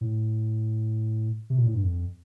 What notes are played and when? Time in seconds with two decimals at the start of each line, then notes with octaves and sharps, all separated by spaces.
0.01 A2
1.50 C3
1.58 A#2
1.66 A2
1.75 G2
1.84 F2